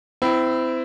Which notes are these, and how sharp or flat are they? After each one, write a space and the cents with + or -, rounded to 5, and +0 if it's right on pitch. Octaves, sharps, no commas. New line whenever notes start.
C4 -25 E4 +5